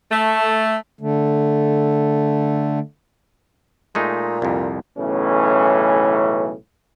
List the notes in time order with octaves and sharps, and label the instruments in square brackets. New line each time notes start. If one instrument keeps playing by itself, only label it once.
[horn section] A3
[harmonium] D3 A3
[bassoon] A#2 [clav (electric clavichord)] G#3 A3 D#4
[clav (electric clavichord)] C2 F2
[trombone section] B1 A2 C#3 E3 C#4